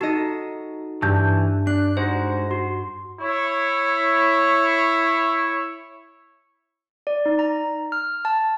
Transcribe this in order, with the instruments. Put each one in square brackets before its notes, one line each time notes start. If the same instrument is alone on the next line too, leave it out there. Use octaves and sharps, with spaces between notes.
[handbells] D#4 F#4 [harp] A4 D#5
[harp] G2 [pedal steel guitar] E3 A5 G6
[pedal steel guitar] D4 [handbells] F#6
[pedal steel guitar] G#3 D#4 F#4 [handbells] C5
[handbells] F#4 [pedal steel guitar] C6
[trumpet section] E4 C#5
[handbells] D5
D#4
A#5
F6
A5